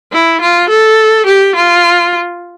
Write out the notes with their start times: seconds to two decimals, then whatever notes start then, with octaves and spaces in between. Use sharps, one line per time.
0.13 E4
0.41 F4
0.70 A4
1.26 G4
1.55 F4